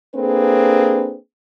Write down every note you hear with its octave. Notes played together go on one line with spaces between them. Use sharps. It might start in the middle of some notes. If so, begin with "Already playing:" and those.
A#3 C4 D4 G#4 A4 B4